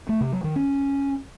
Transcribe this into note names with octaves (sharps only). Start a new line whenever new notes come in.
A3
C3
F#3
D#3
C#4